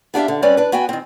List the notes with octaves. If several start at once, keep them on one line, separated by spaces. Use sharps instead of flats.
B3 D4 G4 E5 F5
D3
G3 C4 C#4 B4 D5
D4 B4
B3 F#4 G5 G#5
D#3 C4